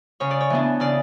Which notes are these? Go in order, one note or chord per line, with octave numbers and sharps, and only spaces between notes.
C#3 C#5
D5
C#5
E3 B3 D4
C#3 D5